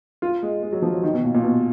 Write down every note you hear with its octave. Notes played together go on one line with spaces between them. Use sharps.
F4
G#3
G#3
F#3
F3
F#3
D#3
B2
A#2
A#2
B2